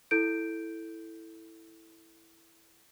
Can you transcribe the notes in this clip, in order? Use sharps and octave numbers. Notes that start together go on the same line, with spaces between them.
E4 A4 G6 D7